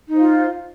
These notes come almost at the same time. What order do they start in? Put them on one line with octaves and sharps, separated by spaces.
D#4 C5 F5 F4